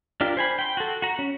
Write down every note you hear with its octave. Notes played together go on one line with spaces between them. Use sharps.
D4 F4 G4 A#4
C5 G#5 B5
G5 C6
F#4 A4
F#4 A#5
C#4